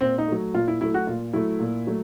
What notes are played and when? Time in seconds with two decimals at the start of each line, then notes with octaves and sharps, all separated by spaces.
0.01 A#2 C4
0.18 D#4
0.27 F#3 A3
0.54 A#2 F4
0.68 E4
0.81 F#3 A3 E4
0.94 F#4
1.07 A#2 F4
1.33 F#3 A3 E4
1.60 A#2
1.87 F#3 A3